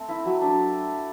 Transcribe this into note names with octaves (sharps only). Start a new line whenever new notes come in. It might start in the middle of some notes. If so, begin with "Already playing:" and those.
Already playing: A3 C4
E4
F#3
D4